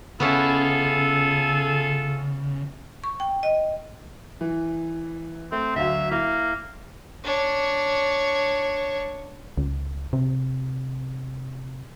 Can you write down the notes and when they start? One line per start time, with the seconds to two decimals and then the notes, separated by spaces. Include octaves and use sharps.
0.20 C#3 B3 C#4 E4 F4 G#4 A4
3.04 C#6
3.20 G5
3.43 D#5
4.41 E3
5.52 A3 C4
5.76 D2 F#3 E5 F5
6.12 A#3 E4
7.24 D4 C#5
9.58 C#2
10.13 C3